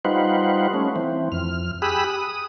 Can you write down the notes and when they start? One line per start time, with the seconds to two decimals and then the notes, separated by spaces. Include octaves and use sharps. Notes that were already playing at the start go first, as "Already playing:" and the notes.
0.05 G3 D#4 F4 B4 C5 F#5
0.74 A3 C#4
0.96 E3 C4
1.32 F2 F6
1.82 G4 G#4 B5 D#6 E6 F#6
2.10 D#6